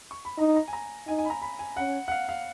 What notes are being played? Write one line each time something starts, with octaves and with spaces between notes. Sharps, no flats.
C#6
B5
D#4 A#5
A#5
G#5
A#5
D#4 G#5
G#5
B5
A#5
B5
G#5
C#4 F#5
F#5
F5
F5